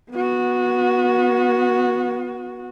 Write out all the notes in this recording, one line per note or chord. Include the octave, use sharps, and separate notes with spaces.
B3 F#4